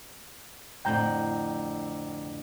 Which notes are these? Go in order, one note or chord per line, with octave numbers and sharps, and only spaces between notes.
F2 A2 D3 G5 A#5 G6